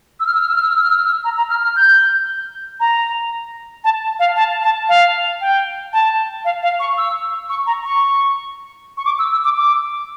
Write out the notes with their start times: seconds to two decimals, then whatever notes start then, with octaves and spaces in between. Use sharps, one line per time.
0.20 E6
0.27 F6
0.34 E6
0.41 F6
0.48 E6
0.55 F6
0.62 E6
0.70 F6
0.77 E6
0.83 F6
0.90 E6
0.98 F6
1.05 E6
1.24 A#5
1.37 A#5
1.50 F6
1.63 F6
1.76 G6
2.80 A#5
3.84 A5
4.19 F5
4.36 A5
4.63 A5
4.89 F5
5.41 G5
5.93 A5
6.45 F5
6.63 F5
6.80 C#6
6.98 E6
7.49 C#6
7.66 A#5
7.84 C#6
8.97 C#6
9.05 D6
9.19 E6
9.31 E6
9.45 D6
9.57 D6